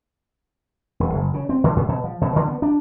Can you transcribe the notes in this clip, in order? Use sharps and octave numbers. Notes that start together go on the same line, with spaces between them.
E1
F#1
C#3
C4
D3
G#2
B2
F3
B2
D3
B3
D4